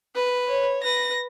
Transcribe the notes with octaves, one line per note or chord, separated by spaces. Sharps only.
B4
C#5
B4 A#6